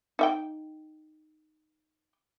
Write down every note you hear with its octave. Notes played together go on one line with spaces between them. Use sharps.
D#4 E5 G5